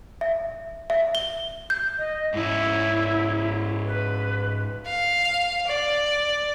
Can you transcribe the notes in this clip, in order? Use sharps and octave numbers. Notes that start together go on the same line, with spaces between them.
E5
E5
G7
G6
D#5
G#2 C#4 E4
B4
F5
D5